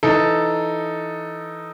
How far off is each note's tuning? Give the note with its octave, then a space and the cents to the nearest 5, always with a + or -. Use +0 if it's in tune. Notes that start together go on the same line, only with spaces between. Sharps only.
E3 +10 D#4 +0 A4 +0